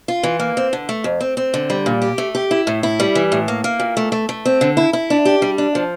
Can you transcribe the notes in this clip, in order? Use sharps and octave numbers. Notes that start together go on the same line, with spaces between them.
F4
E3
A#3
C4
D3
A3
F2
C4
C4
D3
G3
A#2
G4
A3
G4
E4
A2
E4
G3
E3
A2
A#3
A#3
A#2
A3
A3
A3
C4
D3
E4
E4
D4
G4
G3
D4
F3